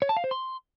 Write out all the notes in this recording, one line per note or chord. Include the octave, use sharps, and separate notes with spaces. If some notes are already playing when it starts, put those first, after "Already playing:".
C#5
A5
F5
C5
C6